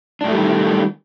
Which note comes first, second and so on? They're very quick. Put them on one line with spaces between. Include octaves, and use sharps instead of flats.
D4 A2 A3 G3 D#3